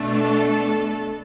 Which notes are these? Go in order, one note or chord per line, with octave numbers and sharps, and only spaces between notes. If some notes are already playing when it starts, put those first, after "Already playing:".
Already playing: B2 A3 D4
A4